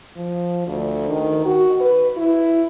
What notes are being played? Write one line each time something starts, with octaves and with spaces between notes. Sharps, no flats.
F3
D2
D#3
F#4
B4
E4